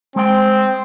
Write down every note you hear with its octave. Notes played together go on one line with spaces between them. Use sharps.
G#3 C4 G5